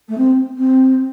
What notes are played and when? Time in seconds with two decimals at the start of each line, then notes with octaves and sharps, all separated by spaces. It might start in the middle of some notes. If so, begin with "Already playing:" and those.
0.08 A3
0.17 C4
0.57 C4